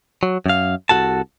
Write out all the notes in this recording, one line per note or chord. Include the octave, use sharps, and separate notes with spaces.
F#3
F#2 F5
C2 C3 F#4 A4 A5